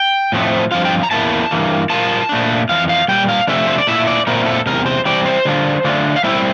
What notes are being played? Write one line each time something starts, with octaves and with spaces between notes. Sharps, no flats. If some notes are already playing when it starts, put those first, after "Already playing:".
Already playing: G5
A2 F3 A3 C4
G2 F3 C4 F4 F5
G5
A#5
E2 E3 A#3 E4 A5
G2 E3 A#3
A#2 G3 A#3 F4 A5
A#2 A3 D4
F2 E3 F5
F5
A#2 G3 G5
F5
C3 F3 A3 D4 E5
C5
D5
A#2 A3 E4 E5
D5
A#2 A3 C4 E4 A#4
A4
E2 C3 A#4
C5
E3 G3 C4 D5
C5
D3 G3 D4 F4
D3 A3 D4 F4
F5
A2 G3 C4 E4 E5